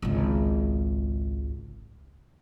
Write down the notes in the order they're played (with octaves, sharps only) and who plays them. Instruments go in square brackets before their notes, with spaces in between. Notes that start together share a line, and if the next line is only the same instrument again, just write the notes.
[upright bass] G#1 C#2